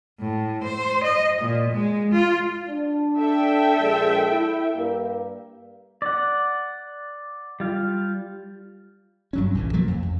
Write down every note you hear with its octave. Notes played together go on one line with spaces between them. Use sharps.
A2
C5
D#5
A#2
G#3
F4
D4
A4 E5 G5
A#1 G#3
E4
G2 A#3
D5 F#5
G3 F4
G2 F#3 C#4
B1 A#2 E3
F3 F#3 A3 A#3
F2
F2